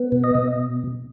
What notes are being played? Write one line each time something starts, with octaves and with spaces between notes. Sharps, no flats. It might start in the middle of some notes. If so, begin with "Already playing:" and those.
Already playing: B3
B2
D#5
B2